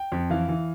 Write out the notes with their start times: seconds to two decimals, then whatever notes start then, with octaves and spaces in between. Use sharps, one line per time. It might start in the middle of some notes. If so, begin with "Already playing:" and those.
Already playing: G5
0.12 F2
0.30 E3 F5
0.49 E3